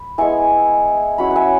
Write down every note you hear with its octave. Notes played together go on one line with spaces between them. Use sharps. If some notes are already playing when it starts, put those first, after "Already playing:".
Already playing: B5
G#3 B3 E4 G#5 C#6
F#3 C#4 E4 F#5 B5
E5 F#5 G#5